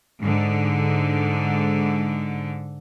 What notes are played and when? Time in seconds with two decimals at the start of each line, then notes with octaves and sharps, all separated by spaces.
0.20 G#2 D3